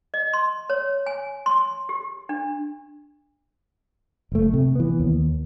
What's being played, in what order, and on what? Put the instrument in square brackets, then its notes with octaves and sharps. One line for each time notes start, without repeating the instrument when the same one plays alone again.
[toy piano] D#5
C6
C#5
G#5
C6
G4
D4
[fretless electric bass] F#1 A3
C3
E3 B3
D#2